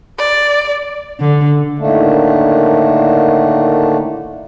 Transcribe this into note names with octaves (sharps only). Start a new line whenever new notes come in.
D5
D3
A2 D3 D#3 A3 A#3 D4